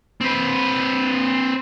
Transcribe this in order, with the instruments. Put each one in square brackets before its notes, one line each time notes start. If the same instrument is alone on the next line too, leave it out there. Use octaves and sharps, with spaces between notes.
[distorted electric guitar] C4 B4